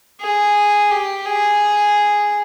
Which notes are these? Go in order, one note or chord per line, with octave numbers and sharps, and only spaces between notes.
G#4
G4
G#4